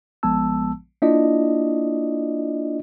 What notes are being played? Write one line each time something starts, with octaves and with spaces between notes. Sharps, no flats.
A#1 F3 G#3 B3 A5 E6
A#3 D4 E4 F4 D5 D#5